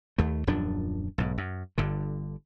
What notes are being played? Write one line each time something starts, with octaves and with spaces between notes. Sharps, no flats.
D#2 A3
D#1 F#2 F3 D4
B1 G#2
F#2
G1 G2 D3